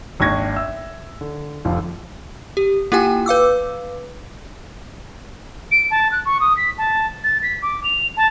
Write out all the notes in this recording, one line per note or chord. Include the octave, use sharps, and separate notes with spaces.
G#1 D#2 D4 C#6 G#6 A#6
E5 E6
D3
F1 D3 F3
G4
A#3 E4 F4 G4 G5 G#5
B4 F5 D6 E6
D7
A5
F#6
C#6
D#6
B6
A5
A6
B6
D6
F7
A5